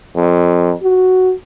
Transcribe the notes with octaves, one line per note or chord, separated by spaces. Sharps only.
F2
F#4